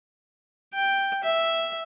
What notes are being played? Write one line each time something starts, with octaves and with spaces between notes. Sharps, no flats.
G5
E5